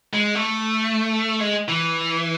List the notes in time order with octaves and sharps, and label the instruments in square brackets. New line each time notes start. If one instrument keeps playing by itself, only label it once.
[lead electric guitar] G#3
A3
G#3
E3